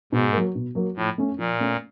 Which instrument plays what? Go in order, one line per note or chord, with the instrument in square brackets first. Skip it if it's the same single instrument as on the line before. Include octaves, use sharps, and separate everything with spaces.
[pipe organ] G#2 [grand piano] B2
[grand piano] F#3 A#3
B2
F#3 A#3
[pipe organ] A2 [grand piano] F3
[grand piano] A3 C#4
[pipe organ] A#2 [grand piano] F3
[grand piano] A3 C#4